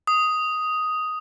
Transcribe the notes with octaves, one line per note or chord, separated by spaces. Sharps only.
D#6